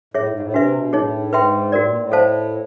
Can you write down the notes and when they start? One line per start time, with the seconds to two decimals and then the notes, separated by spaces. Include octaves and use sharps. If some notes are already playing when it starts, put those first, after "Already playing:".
0.14 A2 G#4 C#5 E5
0.28 G#2
0.40 A2
0.53 C3 D4 F#4 B4 E5
0.73 B2
0.93 A2 D#4 G#4 C#5
1.33 G#2 B4 E5 G5 C6
1.72 A2 F#4 A#4 D5
1.85 A#2
1.98 A2
2.12 A4 C5 F5 A5